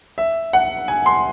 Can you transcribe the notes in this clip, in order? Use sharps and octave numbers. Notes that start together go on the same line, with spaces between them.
E5
F#5
G#5
C6